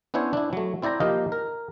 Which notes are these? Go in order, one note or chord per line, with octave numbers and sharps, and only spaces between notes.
B3 C#4 D4 E4 C5 C#5
D4 E4
F#3 A3
C4 E4 D5 G5 A#5
F3 A#3 D#4 G4 D#5 F5
A#4